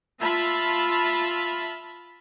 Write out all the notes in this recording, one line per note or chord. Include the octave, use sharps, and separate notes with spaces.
F4 E5 A5 B5